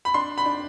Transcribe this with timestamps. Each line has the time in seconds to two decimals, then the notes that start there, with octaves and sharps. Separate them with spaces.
0.05 B5
0.14 D4 C6
0.38 B5
0.46 D4